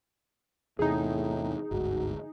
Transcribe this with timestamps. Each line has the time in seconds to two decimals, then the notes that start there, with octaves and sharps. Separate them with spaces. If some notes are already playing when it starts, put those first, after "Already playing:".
0.79 E2 A2 C3 D#4 G#4
1.71 G1 D2 G#2 F#4